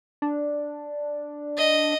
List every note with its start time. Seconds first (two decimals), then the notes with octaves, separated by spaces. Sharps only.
0.22 D4
1.58 D#5